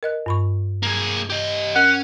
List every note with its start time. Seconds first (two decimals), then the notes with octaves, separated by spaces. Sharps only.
0.03 A#4 D#5 F#6
0.26 G2 B5 C#6
0.83 A#3 G#4
1.30 G4 D#5
1.76 C#4 A#4 F#5